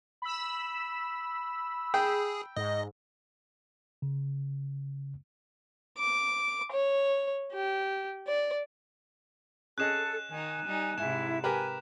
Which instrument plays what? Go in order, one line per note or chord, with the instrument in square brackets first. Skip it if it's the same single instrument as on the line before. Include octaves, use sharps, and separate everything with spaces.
[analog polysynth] B5 E6
[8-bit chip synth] G#4 [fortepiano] G5
[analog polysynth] G#2 [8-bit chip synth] D#5
[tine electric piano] C#3
[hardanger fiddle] D6
C#5
G4
D5
[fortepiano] C#4 G#4 D#5 [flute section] A4 [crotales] F#6 E7
[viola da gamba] D#3 D#4 [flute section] G#5
[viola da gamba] G3 D#4
[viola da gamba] G#2 C3 [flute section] E4 [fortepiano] G#5 [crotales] E7
[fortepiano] G4 A#4 B4 [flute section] G#5